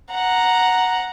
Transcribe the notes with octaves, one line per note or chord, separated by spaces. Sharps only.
F#5 A#5